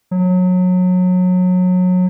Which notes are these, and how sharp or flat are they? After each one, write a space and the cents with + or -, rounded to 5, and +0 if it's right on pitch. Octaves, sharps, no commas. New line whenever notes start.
F#3 -25